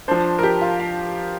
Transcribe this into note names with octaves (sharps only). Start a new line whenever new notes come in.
F3 D4 C5
A#4
G4
F4
F5